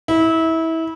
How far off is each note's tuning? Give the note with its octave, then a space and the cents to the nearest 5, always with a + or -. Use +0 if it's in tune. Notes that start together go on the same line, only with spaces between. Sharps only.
E4 -25